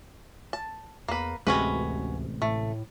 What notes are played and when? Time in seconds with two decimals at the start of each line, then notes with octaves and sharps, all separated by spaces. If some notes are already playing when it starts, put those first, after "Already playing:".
0.53 A5
1.08 E2 A#3 B4
1.47 A1 D2 C3 G#3 C#4 F#4 B4
2.42 A2 A3